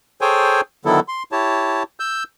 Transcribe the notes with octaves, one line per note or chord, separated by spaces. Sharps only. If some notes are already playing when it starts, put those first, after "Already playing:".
G#4 A4 C5 C#5 G5 G#5
D3 D#3 F#3 B3 E4 A4
C6
E4 G4 C#5 A5
E6 G6